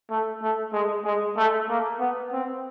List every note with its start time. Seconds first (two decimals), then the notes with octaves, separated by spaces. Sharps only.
0.10 A3
0.42 A3
0.73 G#3
1.05 G#3
1.37 A3
1.69 A#3
2.00 B3
2.32 C4